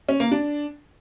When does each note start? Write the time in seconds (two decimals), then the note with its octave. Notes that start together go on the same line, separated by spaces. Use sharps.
0.09 C#4
0.20 A#3
0.32 D4